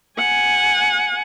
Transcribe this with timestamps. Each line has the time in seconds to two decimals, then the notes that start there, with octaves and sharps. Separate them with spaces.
0.18 F#5 G#5